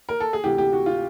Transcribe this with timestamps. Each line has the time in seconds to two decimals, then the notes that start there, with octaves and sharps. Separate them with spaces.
0.09 A#4
0.20 A4
0.33 G#4
0.44 D2 C3 E3 G4
0.58 G4
0.73 F#4
0.86 F4